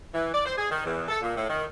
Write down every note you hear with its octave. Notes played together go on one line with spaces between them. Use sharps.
E3
D5
C5
G#4
D#3
E2
A4
A#2
A2
D#3